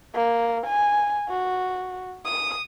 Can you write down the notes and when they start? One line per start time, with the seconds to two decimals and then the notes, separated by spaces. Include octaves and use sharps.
0.14 A#3
0.66 G#5
1.29 F#4
2.25 D#6